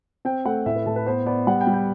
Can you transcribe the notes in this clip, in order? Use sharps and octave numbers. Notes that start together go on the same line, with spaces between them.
C4 G5
A3 F#5
A2 E5
B4
A2 A4
B4
B3 C5
B3 D5
G3 F#5
G5
G3
G5